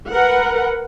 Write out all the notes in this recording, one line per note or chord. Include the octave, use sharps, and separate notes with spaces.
A#4 B4 F#5